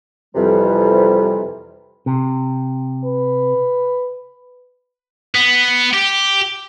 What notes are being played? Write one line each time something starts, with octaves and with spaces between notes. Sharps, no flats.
F2 C3 E3 G3
C3
B4
B3
G4